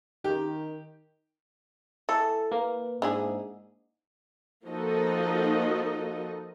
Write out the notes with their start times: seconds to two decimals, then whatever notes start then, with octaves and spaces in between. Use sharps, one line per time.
0.24 D#3 G4
2.09 E3 A4
2.52 A#3 B4
3.02 G#2 D4 E4 G#4
4.64 F3 A#3 D#4 F#4 A4 D#5